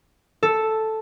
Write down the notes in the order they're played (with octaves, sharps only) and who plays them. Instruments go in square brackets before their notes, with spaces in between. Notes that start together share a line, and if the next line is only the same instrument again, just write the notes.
[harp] A4